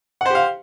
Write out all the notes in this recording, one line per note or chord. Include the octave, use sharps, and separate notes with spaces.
G4 C5 F5 F#5